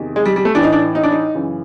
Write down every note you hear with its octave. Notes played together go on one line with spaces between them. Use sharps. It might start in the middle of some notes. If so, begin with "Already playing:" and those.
Already playing: E2 C3 D#3
G#3
G3
G3
A3
A2 E3 D4
D#4
D4
D#4
D4
D#4
F#2 C#3 E3